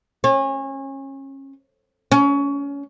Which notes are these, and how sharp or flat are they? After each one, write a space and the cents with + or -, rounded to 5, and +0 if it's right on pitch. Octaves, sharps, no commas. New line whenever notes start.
C#4 -30
C#4 +25